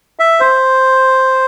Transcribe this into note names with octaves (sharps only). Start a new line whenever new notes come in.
E5
C5